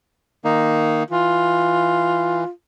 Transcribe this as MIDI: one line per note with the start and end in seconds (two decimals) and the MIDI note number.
0.44 1.03 51
0.44 1.03 58
0.44 1.03 63
1.11 2.44 52
1.11 2.50 65